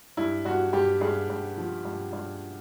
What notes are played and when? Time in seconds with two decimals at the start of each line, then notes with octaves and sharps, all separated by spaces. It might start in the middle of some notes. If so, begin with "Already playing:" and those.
0.17 G2 E4
0.45 G2 F#4
0.73 G2 G4
1.01 G2 G#4
1.30 G2
1.57 F3
1.85 G2
2.13 G2